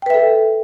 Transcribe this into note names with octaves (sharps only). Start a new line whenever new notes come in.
A4 B4 E5 G5